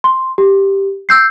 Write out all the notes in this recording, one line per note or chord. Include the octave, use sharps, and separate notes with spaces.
C6
G4
E6 G6 C7